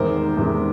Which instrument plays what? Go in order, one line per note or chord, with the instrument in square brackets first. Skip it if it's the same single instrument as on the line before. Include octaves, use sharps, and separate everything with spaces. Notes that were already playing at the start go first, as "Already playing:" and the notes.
Already playing: [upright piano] E2 C3 D#3 G#3 A#4 C5
E2 C3 D#3 G#3